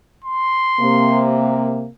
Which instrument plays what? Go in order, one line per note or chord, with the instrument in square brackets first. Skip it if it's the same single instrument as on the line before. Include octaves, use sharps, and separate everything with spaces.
[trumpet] C6
[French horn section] C3 A#3